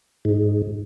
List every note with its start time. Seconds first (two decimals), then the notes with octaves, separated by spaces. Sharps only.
0.25 G#2